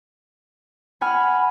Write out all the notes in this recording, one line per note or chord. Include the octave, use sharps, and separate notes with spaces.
F#5 G#5 B5 F6